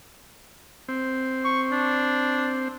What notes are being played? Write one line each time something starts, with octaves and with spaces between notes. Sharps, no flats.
C4
C#6
D4